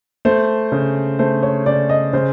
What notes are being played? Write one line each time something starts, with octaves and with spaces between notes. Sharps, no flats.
A3 C5
C#3
A3 C5
C#5
C#3 D5
D#5
C#3 C5